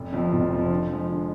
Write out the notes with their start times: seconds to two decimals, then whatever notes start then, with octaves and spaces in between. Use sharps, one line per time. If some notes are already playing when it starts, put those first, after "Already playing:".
Already playing: F1
0.12 F2 C3 F3
0.33 F1
0.51 F2 C3 F3
0.70 D3
0.89 F3 G#3
1.09 D3